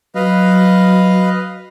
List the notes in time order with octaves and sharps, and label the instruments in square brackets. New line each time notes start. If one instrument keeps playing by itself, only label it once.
[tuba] F#3 [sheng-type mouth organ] B4 D#5 F5